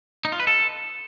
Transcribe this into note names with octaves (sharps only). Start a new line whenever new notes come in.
D#4
F4
B4
A4